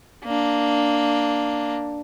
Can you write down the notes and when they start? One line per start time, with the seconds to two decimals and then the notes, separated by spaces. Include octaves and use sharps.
0.24 A#3 D4